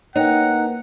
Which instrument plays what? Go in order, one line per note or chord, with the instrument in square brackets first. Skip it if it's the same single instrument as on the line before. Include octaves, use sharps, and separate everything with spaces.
[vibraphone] A#3 A#4 B4 [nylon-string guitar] D#4 [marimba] C#5 G5 [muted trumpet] F#5